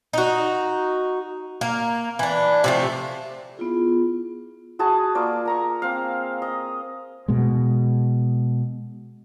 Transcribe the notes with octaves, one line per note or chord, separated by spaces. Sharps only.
D#4 F#4
A#3
E3 D4
C3 F3 A3
B3 E4 F4 G#4
F#4 G#4 D#5 A5
A#3 F4 D5
A#4 A#5 C#6
C4 F5
D#5
B2 G#3